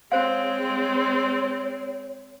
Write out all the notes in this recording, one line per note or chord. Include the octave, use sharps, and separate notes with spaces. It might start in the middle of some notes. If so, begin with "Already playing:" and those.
G#3 C4 C5 C#5 F5